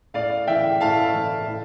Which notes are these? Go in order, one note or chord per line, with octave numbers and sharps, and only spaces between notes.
A2 D5 F5
E3 E5 G5
A2 F5 A5
E3
A2